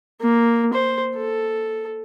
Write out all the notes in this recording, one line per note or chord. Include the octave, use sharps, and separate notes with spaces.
A#3
C5
A4